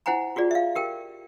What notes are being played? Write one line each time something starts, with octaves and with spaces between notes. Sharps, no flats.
E4 C5 F#5 G#5 A#5
F4 F#4 G#4 D5
E5 F5
G4 A#4 G5